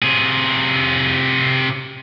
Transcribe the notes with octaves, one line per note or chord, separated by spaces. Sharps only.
C3 G#4